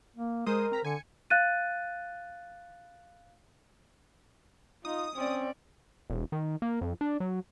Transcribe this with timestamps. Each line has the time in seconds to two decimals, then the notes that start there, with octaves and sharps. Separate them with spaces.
0.16 A#3
0.46 G#3 A#4 C5 D#6
0.72 C4 A#5 B6
0.84 D3 G#5 C#7
1.30 F5 F#6 A6 D#7
4.85 D#4 F4 D#6
5.16 C4 C#4 D5
6.10 E1
6.32 D#3
6.62 A#3
6.81 F2
7.01 D4
7.20 F#3